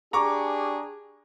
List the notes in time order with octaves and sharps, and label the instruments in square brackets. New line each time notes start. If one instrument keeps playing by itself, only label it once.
[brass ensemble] D4 G4 G#4 [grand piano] A#5 C#6 D6